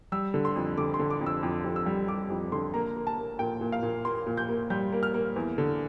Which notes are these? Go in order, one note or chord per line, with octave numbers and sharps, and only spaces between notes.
G3 E6
D3
C6
F2
D3 D6
C6
D3
D6
F2
E6
F2
F2
E6
G3
G3 D6
F2
D3 C6
A#3 A#5
A#3
A5
A#3
A#2 G5
A#2
F5
A#2
A#3 C6
A#2
G6
A#3
G3 G6
A#3
F6
A#3
E2
D3